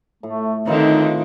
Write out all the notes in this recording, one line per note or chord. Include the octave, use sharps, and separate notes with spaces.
A2 A3
D3 D#3 C4 D#4 F4 B4 C#5